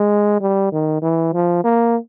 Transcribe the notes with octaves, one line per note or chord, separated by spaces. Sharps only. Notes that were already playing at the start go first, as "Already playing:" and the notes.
Already playing: G#3
G3
D#3
E3
F3
A#3